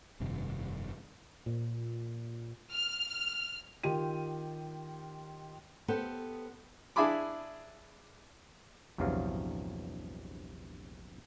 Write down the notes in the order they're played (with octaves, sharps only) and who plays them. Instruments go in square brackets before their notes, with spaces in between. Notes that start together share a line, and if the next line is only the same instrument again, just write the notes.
[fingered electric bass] F1 G2 C3 D#3
[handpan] A#2
[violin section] F6
[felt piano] D#3 F4 G4 G5 D#7
[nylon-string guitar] B3 G4 A4 C5
[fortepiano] D4 E4 G#4 G#5 B5 D6
[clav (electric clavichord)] A#1 E2 G2 C3 F#3 F5